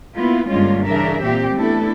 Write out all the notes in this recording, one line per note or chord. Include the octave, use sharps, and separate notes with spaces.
A#3 B3 E4 F4
G2 D3 G#3 A#3 C#4 F4
C#3 E3 D4 A#4 E5
A#2 C4 G4
A3 B3 D4 E4 A4